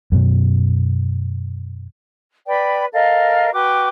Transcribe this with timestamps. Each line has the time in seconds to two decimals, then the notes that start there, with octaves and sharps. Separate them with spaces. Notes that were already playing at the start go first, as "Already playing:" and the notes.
0.12 F#2 B2
2.47 B4 D5 G5 B5
2.93 A4 A#4 D#5 F5
3.53 F#4 B4 G5 D6